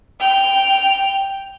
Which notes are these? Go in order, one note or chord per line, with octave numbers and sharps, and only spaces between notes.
G5 F7